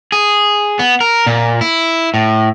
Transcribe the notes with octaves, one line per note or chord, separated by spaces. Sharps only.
G#4
B3
A#4
A#2
E4
A2